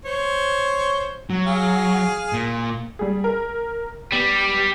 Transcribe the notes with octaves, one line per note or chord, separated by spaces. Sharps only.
C5 C#5
F#3
G#4 F5
A#2
G3 G#4
A#4
G3 B3